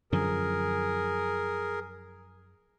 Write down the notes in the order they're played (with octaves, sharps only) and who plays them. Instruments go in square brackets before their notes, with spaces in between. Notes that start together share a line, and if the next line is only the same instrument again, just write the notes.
[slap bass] F#2 D3 F3 [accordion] G#4 A#4